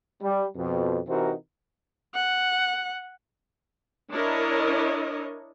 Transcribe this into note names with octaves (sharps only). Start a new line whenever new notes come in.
G3
F2 B2
C3 E3 C4 D#4 F#4 A#4
F#5
D4 E4 A#4 C#5 D#5